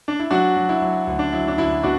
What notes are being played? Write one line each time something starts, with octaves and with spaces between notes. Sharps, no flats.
D4
E4
F#3 D4 F#4
F#3
E4
F#3
D2
D4
F#3 E4
D4
D2 E4
B2 D4 F#4